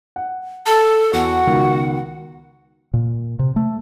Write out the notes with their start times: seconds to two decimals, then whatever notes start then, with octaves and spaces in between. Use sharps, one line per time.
0.16 F#5
0.66 A4 A5
1.13 E2 F#4 F#5
1.47 C#2 B2 D#3
2.94 A#2
3.39 C3
3.56 A3